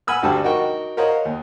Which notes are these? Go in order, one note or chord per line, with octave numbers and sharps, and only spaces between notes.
F#5 G#5 B5 E6 F6
D2 G2 D3 G3 F#4 A5
D#4 F#4 A#4 G5 C#6
A#4 C5 C#5 D#5 F5 F#5
D#2